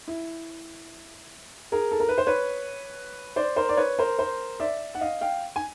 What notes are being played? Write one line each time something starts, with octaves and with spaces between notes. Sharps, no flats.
E4
G#4 A#4
A4
A#4
B4
C5
B4 C#5
C5 D5
A#4 C5
D5
B4 C#5
A#4 C5
A#4 C5
D5 E5
F#5
D#5 F5
F5 G5
G#5